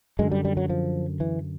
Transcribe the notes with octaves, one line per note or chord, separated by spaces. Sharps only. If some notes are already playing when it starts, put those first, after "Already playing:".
F#2 D3 G#3
G3
G3
F#3
F3
E3